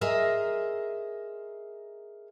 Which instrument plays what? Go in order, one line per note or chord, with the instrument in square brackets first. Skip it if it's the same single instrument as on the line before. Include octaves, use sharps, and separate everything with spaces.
[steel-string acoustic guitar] G#4 A#4 C5 D#5 E5